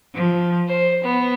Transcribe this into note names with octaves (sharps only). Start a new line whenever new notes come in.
F3
C5
B3